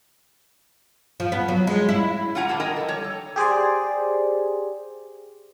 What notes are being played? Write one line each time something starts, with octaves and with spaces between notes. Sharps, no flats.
F3
B3
F#3
G#3
E4
F4 F#4 F#5 G#5 A#5
A#2 A#3 G#5 A5
A#4 D#5 G5 G#5
F3 A4
G3 C#5
A4
G4 G#4 C5 D5